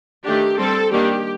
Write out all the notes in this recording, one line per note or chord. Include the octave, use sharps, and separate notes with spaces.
D#3 A3 D4 G4
G3 C4 A4
D#3 G3 A#3 D4 G4